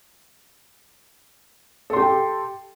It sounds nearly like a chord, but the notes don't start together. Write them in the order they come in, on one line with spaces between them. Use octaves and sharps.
A4 C6 G4 G5